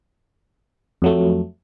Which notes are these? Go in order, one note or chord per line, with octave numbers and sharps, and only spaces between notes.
F2 F#3 A3